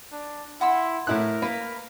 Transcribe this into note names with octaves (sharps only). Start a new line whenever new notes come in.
D4
E4 F#5 C6 E6
A2 E4 A#4 F#6
A#3 B4